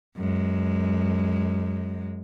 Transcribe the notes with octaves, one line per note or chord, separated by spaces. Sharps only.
F#2 G#3